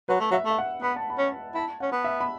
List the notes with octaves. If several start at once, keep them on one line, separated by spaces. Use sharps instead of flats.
F#3 B4
A3
F#3 E5
A3 E5
F#5
B3 B5
A5
B5
C#4
E4 A5
C#4 F#5
B3
E5
B5